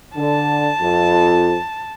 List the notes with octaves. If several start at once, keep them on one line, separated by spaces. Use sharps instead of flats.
D3 A5
F2